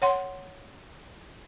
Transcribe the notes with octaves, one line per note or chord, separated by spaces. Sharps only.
C#5 F#5 C6